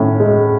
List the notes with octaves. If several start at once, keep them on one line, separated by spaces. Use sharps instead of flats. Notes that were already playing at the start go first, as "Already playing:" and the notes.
Already playing: A2 C#4
G#3